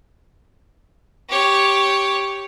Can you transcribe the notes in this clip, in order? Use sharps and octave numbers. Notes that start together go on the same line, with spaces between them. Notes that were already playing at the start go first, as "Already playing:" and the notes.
G4 C#5